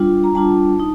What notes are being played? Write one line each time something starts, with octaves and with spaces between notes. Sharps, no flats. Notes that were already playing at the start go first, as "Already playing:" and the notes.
Already playing: G3 D4 F4
A#5
G3 D4 F4 A5
D#4